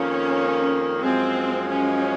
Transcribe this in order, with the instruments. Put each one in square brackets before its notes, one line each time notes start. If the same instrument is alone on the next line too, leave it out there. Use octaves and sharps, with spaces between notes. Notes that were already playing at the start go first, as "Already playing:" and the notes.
Already playing: [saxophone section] F2 D#3 A#3 F4 [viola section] C#4
[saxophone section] F#2 F3 G#3 [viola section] C4
[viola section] C#4